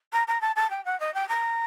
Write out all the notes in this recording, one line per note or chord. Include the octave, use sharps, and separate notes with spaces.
A#5
A#5
A5
A5
G5
F#5
D#5
G5
A#5